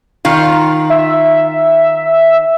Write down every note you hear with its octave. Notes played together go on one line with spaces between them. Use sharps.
D#3 F4
E5